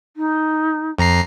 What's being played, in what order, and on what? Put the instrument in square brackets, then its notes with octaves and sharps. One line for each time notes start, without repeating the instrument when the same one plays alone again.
[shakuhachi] D#4
[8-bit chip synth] F2 A#5 C7